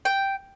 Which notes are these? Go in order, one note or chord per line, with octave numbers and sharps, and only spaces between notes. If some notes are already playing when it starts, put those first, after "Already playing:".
G5